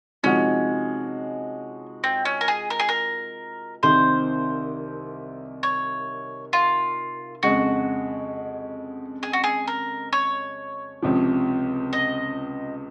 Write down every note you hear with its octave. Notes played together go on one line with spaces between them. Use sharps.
C3 F3 G#3 C#4 D#4 F#4
C4
C#4
A#4
G#4
A#4
G#4
A#4
C2 C3 D#3 C5
C#5
F4
F2 C#3 G#3 F#4
G#4
F#4
G#4
A#4
C#5
C#2 C3 F3
D#5